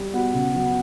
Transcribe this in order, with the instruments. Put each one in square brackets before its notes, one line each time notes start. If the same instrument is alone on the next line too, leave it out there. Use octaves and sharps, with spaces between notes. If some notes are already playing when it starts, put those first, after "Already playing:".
Already playing: [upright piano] G3
[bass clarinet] B3 [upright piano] F#4
[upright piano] C#3
F#3